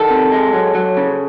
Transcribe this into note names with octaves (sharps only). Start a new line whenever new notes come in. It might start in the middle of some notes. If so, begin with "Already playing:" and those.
Already playing: D#3 A4
C3
G#3
F#3
F#3
C#3